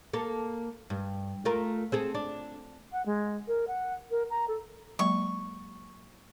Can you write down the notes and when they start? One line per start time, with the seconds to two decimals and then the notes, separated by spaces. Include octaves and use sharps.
0.13 A#3 A4
0.90 G2
1.45 A3 F4 A#4
1.92 C4 G#4 A4
2.15 D4
2.92 F#5
3.06 G#3
3.48 A#4
3.67 F#5
4.11 A#4
4.30 A#5
4.48 A4
4.99 F#3 G#3 A#3 C#6